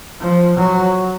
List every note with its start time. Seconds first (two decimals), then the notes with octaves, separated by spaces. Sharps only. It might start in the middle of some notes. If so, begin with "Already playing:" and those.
0.20 F3
0.57 F#3